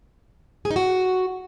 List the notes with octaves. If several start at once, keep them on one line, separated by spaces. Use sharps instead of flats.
G#4
D#4
F#4